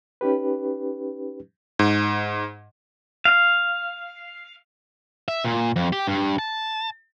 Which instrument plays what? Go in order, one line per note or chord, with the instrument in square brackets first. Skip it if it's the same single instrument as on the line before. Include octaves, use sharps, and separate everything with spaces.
[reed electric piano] C#4 D#4 G4 B4
[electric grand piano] G#2
[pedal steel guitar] F5
[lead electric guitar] E5
A#2
F2
G4
G2
A5